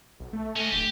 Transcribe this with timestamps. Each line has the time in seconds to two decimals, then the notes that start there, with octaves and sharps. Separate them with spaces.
0.20 B1
0.33 A3
0.56 C#4 D#5
0.72 D1 G4